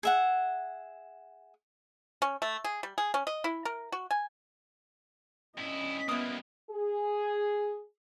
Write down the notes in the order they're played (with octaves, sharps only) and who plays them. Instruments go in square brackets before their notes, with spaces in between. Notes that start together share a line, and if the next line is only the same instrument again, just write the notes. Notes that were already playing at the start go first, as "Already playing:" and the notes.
[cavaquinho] G#4 E5 F#5
[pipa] C#4
A3
G#4
G3
G#4
C#4
D#5
E4
A#4
F#4
G#5
[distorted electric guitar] G2 E4 [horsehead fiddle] C#4 D#5
[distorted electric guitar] G3 A#3 [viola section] B3 [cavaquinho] E4 D#6
[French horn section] G#4